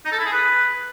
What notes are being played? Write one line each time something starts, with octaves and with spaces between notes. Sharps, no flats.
D#4
A4
E4
G#4
B4